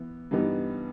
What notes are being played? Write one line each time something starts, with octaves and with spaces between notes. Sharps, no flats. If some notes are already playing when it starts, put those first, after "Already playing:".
Already playing: E3 B3
G2 E3 G3 B3 D#4